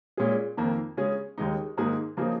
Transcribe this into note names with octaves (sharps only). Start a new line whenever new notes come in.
A#2 G#3 C#4 G#4
F2 D#3 A#3
C#3 G#3 C#4 G#4
D#2 C#3 G#3 D#4
G#2 D#3 A#3 D#4 G#4
C#3 F3 A#3 D#4 G#4